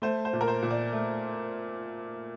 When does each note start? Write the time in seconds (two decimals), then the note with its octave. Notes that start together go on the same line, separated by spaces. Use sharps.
0.02 A3 C5
0.25 C5
0.33 A#2
0.41 A#4
0.48 C5
0.62 A#2
0.71 D5
0.93 A3